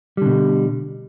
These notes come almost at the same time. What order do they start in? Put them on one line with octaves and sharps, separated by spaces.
G3 D3 B2